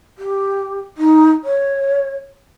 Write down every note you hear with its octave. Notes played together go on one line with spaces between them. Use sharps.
G4
D#4
C#5